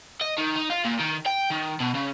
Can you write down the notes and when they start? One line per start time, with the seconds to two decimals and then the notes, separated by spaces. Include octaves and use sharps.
0.21 D#5
0.38 D#3
0.56 D#4
0.70 F4
0.84 A#2
0.99 D#3
1.26 G5
1.51 D#3
1.80 B2
1.95 C#3